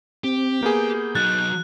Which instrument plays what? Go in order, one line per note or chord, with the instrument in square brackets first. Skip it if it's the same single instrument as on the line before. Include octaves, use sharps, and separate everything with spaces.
[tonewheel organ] C4 [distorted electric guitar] G4
[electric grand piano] A#3 B3 G#4 [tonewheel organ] G6
[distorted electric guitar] F#3 D#4 [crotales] F#6 [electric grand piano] A6